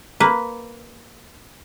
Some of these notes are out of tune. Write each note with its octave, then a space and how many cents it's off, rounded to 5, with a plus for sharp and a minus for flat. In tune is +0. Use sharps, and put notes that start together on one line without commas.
A#3 +0 B4 +0